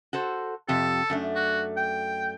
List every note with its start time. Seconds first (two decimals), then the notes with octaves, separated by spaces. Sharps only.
0.13 F#4 A4 C5
0.68 F2 C3 G4 A4
1.10 F#2 A3 D4
1.35 F#4
1.77 G5